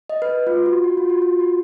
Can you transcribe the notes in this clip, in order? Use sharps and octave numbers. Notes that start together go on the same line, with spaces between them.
D#5
B4
F4
F#4
F#4
F4
F#4
F4
F#4